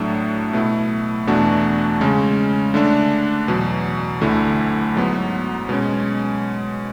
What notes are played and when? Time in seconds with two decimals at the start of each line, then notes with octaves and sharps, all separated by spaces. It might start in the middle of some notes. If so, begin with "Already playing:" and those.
Already playing: A2 F#3 A3 D4
0.53 B2 A3 E4
1.27 E2 B2 A3 D4 F#4
2.01 C#3 G#3 C#4
2.74 D3 A3 D4
3.48 E2 B2 F#3
4.21 D2 D3 A3 E4
4.95 G#2 F#3 B3
5.69 B2 G#3 C#4